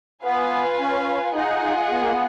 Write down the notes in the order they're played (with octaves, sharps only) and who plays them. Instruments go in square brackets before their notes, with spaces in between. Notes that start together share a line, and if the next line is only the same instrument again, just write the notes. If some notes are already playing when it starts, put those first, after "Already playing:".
[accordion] B3 [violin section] F4 B4 F5 G#5
[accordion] C#4
[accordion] D#4 [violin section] F4 G#4 D#5 F#5
[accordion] B3
A#3
B3